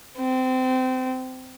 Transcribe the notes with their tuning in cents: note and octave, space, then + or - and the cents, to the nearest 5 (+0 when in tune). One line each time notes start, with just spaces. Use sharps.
C4 -25